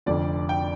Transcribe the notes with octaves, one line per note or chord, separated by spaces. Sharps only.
F1 F2 D3 D5
G5